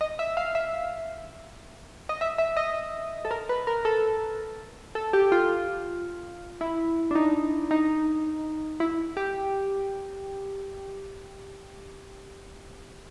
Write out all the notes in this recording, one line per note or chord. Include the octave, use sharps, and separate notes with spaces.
D#5
E5
F5
E5
D#5
E5
E5
D#5
A4
A#4
B4
A#4
A4
A4
G4
F4
E4
D4
D#4
D#4
E4
G4